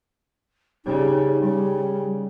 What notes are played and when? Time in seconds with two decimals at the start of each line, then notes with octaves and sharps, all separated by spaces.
0.85 C#3 G3 D#4
1.41 C#3 G3